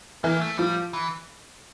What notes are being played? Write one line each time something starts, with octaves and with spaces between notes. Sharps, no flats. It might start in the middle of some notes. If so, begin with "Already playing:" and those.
E3 A#3
A3
F3 G3
E3